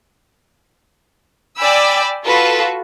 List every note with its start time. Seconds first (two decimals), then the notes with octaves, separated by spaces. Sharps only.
1.59 D5 G5 G#5 B5 E6
2.28 F4 F#4 A4 B4